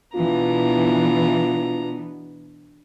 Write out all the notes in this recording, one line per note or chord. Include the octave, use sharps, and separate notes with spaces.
B2 E3 B3 D4 F4 A#5